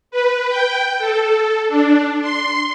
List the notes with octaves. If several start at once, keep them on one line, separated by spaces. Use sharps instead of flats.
B4
G5
A4
D4
C6